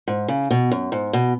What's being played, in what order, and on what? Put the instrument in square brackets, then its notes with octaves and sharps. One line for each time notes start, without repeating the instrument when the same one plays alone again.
[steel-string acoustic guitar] G#2
C#3
B2
F#2
G#2
B2